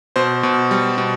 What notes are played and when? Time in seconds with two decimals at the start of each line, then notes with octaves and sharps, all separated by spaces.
0.16 B2 C5
0.43 B2
0.71 G3
0.98 B2